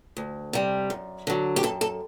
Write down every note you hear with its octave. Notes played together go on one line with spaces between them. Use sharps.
D2
C3 G3
F#2
D3 F#3
G4
F#2 A4
A4